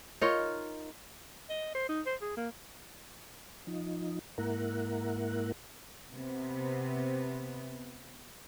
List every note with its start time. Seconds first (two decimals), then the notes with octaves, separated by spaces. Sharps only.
0.21 D#4 F4 A#4 C#5
1.49 D#5
1.75 C5
1.89 D#4
2.06 C5
2.21 G#4
2.37 A#3
3.67 F3 D#4
4.38 G#2 A#3 E4 A#4 F#5
6.14 C3 B3